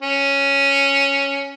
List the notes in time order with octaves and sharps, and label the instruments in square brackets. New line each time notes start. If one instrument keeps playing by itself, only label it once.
[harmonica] C#4